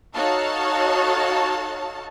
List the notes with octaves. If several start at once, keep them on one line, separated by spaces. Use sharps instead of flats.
D#4 F#4 A4 C#5 F5 A5